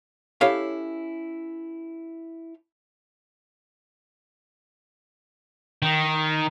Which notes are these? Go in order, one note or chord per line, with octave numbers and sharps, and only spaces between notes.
C#4 E4 G4 A4 C#5 F5
D#3